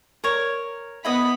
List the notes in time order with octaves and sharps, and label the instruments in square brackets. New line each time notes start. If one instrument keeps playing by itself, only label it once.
[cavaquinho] A#4 C#5
[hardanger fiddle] B3 B5 [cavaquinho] E4 D#5 D#6